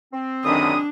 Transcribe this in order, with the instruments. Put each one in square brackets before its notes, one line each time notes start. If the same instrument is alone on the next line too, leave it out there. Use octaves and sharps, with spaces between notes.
[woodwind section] C4
[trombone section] F#2 D3 D#3 [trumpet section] G#3 B5 D#6 [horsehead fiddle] D4